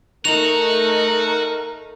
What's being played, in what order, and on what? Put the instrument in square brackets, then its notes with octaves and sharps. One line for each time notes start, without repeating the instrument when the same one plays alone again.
[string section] A3 D#4 [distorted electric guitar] F#4 [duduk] A#4 [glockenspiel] F7 F#7